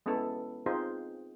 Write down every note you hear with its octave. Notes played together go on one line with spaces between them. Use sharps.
G#3 B3 C#4 E4 A4
C4 D#4 F4 G#4 C5